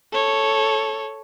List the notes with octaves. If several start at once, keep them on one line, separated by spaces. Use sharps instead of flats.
A4 C#5